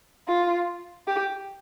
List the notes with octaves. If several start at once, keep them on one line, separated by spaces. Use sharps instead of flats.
F4
G4